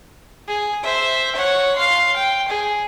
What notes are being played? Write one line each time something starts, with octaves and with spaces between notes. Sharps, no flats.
G#4
C5 E5
C#5 F#5
F5 C6
G5
G#4